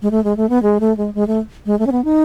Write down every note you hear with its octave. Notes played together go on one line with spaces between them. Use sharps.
G#3
A3
G#3
A3
B3
G#3
A3
G#3
G#3
A3
G#3
A3
C#4
B3
D#4